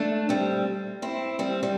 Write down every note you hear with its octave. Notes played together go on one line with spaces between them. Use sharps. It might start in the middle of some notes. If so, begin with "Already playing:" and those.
Already playing: A3 D4
G3 C4
C4 E4
G3 C4
G3